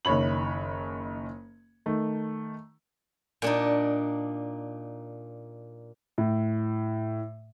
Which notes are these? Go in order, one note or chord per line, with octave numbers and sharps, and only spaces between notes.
F#1 D#3 C#5 B5 F#7
D#3 A3
A#2 D4 D#4
A2